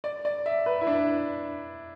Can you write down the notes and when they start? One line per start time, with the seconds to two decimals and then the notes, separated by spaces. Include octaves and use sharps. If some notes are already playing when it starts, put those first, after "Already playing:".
0.04 D5
0.25 D5
0.46 E5
0.66 B4
0.81 E4
0.87 D4